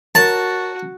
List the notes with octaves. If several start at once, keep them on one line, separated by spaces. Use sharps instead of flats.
F#4 A#4 C#5 A5